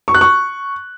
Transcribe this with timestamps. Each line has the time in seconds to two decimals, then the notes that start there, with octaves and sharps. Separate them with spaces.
0.08 C#6
0.14 F#6
0.21 C#6